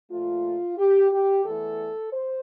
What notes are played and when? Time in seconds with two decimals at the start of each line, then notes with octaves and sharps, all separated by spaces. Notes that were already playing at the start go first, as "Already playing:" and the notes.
0.11 A#2 F3 A3 F4
0.78 G4
1.12 G4
1.44 E2 E3 A3 A4
2.12 C5